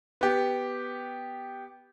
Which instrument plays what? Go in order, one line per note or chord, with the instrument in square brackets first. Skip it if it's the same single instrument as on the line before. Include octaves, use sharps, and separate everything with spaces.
[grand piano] B3 G4